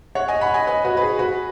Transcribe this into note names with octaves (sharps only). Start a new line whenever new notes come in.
C#5 F#5
D#5 G#5
F#5 B5
D#5 G#5
B4 D#5
F#4 B4
B4
G#4
F#4 B4